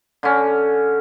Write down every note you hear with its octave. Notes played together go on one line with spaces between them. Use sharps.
D3 C#4